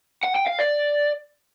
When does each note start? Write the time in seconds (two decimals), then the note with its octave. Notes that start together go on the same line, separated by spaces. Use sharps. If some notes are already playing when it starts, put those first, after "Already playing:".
0.24 F#5
0.36 G5
0.48 F5
0.60 D5